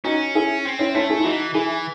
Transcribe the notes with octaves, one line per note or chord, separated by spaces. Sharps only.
C#4 D#4 F#4
E4 G#4
C4
C#4 E4
A3 C#4 E4
E4 G#4
E4
E3 D#4 F#4
E3 E4 G#4